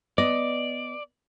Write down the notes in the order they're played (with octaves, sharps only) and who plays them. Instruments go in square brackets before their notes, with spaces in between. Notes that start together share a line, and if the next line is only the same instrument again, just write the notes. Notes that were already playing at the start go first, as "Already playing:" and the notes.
[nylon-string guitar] B3 D#5 [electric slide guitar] D5